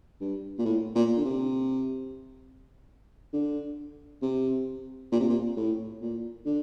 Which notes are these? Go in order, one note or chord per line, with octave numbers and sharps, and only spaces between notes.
G2
A#2
A2
A#2
D3
C3
D3
C3
A#2
C3
A#2
A2
A#2
D3